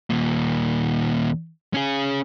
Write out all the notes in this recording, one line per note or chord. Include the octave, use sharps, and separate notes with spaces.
D#2 A#2
C#4 G#4